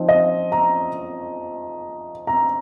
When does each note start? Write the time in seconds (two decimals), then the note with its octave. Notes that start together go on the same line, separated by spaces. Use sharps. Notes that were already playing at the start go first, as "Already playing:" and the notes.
Already playing: F3 C4 D#4
0.09 D#5
0.52 A#5
2.27 A#5